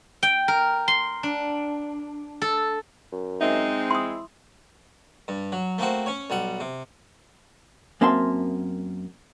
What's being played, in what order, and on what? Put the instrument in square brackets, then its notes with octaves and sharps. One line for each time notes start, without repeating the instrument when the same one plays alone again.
[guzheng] G5
A#4
C6
D4
A4
[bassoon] F#2
[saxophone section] G#3 C4 [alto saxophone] D#4 [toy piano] E5
[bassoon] E4 [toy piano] C6 D#6
[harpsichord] G2
F#3
A3 A#3 C4 F#4
C#4 C#5
B1 G3 F#5
C3
[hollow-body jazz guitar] F#2 A#3 C4 E5 A5 C6